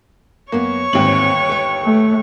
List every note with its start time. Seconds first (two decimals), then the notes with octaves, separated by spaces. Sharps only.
0.52 F#2 A#3 B3 C#5 C#6
0.93 G1 D#2 G#2 C4 F#7
1.49 B4 G5
1.84 A3